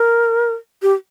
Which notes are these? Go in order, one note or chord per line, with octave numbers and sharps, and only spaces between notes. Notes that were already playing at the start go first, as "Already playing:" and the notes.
Already playing: A#4
G4